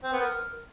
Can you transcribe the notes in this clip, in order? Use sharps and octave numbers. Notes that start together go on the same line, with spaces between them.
C4
B3
A#4